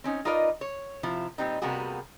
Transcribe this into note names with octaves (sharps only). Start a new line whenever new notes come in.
C4 C#4 D#4
D#4 F4 A#4 B4 D5 D#5
C#5
C3 F3 E4 F4
A#2 G3 C4 D#4
C3 G3 A#3 B3 F#4 G#4